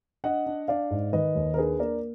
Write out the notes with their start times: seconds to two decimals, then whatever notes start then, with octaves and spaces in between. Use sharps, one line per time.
0.24 D4 D#5 F#5
0.46 D4
0.68 D4 D5 F5
0.91 G#2
1.13 D#3 B4 D#5
1.35 D#2
1.54 A#4
1.58 D4 G#4 B4
1.79 A#3 A#4 D5